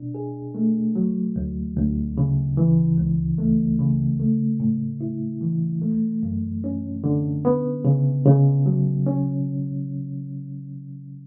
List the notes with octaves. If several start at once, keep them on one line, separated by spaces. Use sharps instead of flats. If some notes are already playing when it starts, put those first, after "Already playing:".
Already playing: B2 D4
G#4
A3
F#3
D2
D2
C#3
E3
C#2
A3
C#3
A3
A2
E4
E3
A3
F#2
C#4
D3
B3
C#3
C#3
F#3
C#4